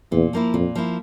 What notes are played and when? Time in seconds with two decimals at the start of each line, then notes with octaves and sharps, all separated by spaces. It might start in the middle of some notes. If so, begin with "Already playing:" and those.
0.12 E2 A#2
0.33 F3 A#3 E4
0.54 F2 A#2
0.75 F3 A#3 E4